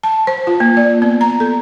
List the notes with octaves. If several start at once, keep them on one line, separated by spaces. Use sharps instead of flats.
A5
C5
F4
A#3
D5
B3
A#5
A4